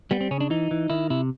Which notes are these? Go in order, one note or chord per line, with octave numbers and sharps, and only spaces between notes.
G3 B3
C4
C#3 C#4
D4
E3 D#4
E3
D#3 E4
C3 E4